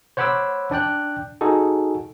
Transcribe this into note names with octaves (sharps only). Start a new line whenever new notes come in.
C5 C#5 F#5 B5 D6 E6
D4 D5 G5 F#6
D#4 F#4 G#4 A4